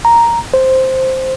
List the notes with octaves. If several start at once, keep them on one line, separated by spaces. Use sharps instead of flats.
A#5
C5